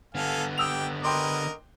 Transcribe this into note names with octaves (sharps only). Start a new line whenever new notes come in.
D3 B3 A4 F5 G#5
G4 G5 D#6 E6 F7
A#4 B4 D#5 G5 C6 D6